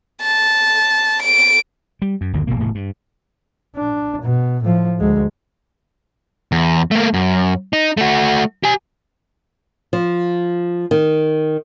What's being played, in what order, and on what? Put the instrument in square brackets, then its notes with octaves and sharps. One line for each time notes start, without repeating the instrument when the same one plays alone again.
[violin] A5
D7
[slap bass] G3
F#2
G1 D#2 D3
D1 G1 B2 A#3
E1 A2 C#3
G2
[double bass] D4
B2
A2 F3
D2 G#3
[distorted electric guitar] E2
A3 A#3
F#2
D#4
A3 F#4
G4 G#5
[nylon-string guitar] F3
D#3